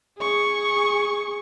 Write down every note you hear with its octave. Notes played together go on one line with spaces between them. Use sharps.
G#4 C#6